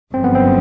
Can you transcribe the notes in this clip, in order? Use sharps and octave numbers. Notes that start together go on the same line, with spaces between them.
G1 F#2 C#3 F3 C4
B3
C4